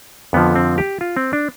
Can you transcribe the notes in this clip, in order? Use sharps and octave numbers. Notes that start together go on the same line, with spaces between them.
F2 D3 F3 B3
C4
G4
F4
C4
D4